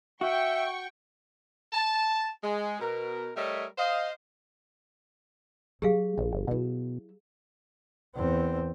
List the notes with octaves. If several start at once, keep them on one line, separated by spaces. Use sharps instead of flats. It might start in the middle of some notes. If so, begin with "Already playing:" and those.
F#4 E5 G5 C#6
A5
G#3
B2 A#4
G3 A3 A#4 C#5 D#5 E5
C5 D#5 F5
F#3 G4 G#4 F5
A#1 F3
G1
B2 F#3 E4
E2 C4